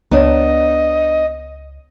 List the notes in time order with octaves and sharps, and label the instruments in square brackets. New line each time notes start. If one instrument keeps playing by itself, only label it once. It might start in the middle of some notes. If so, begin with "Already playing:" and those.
[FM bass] C#2 [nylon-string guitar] B3 D4 [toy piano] C#5 A#5 [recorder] D#5